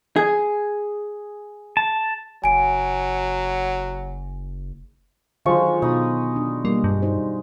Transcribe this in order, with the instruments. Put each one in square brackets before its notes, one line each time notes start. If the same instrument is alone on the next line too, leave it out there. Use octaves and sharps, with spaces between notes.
[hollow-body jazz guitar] G#4
[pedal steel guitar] A5
[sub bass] F#1 [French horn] F#3 [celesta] G#5 D7
[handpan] D3 D#3 F#3 [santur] F3 G#3 C#6
[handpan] B2 [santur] D#4 B5 D#6
[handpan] D4
[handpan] G3 [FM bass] A#3
[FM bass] G2
[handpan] D#4 F#4 C5